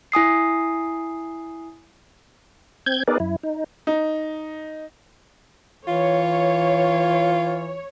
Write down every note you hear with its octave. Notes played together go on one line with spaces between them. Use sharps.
E4 G#5 D#6 C7
C4 G6 G#6
B3 D#4 G#4 A#4 B4 D5
F#2 E4
D#4
D#4
E3 F4 C#5